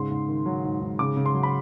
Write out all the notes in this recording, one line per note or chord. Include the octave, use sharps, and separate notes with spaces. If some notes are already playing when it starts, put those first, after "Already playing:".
Already playing: G#2 C#3 C6
G#2
D#3
F#3
G#2
G#2
C#3 D6
C#3
C6
F#3
B5